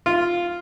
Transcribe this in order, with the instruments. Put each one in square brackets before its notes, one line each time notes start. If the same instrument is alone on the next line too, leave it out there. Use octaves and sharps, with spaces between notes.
[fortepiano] F4